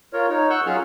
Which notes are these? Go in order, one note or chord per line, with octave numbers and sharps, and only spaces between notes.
F4 A#4 C#5
D#4 C#5
F#5 C#6 E6 F#6 G6
F#3 C#4 F4 G#4 F#5 F6